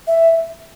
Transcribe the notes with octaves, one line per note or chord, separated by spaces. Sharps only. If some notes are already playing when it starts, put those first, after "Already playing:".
E5